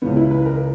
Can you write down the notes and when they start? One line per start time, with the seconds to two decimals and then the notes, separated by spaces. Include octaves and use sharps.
0.02 C#2 C#3 E3 B3
0.16 E4
0.31 B4
0.41 B4
0.45 A#4